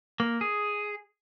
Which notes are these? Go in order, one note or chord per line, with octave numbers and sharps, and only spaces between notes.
A#3
G#4